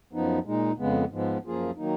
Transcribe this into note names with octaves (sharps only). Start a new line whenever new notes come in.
F#2 F3 B3 D#4
A#2 G#3 D#4
F2 C#3 G#3 B3
G#2 F3 G#3 B3
F#2 F3 A#3 F4 G#4
D#3 F#3 A#3 D#4